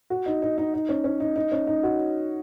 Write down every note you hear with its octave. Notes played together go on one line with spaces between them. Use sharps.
F#4
D#4
D#4
D#4
D#4
C#4
C#4
D#4
D#4
C#4
D#4
F#4